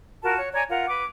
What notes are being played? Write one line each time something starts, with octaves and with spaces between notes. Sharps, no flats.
F4 F#4 A#4 A5
C#5
C#5 D5 G#5 A#5
F4 A#4 F#5
B4 D6